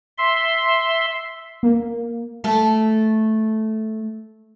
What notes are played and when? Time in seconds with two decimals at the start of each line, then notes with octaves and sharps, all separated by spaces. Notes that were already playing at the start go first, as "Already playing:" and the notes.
0.18 E5 C6
1.63 A#3
2.44 A3 A4